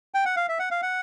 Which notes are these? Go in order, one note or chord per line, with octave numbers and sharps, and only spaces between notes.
G5
F#5
F5
E5
F#5
F5
F#5